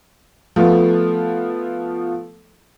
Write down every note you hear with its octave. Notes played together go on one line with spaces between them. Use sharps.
F3 A3 B3 F4